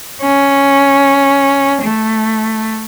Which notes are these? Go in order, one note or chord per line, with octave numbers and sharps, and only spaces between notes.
C#4
A3